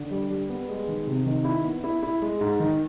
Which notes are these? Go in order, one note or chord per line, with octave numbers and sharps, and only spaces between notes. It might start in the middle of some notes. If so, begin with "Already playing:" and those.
Already playing: D3
G3
G3
B3
G#3
D#3
C3
D#3
E4
B3
E4
E4
G#3
G#2
D#3